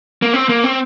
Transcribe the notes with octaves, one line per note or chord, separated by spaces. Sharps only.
A#3
C4
A#3
C4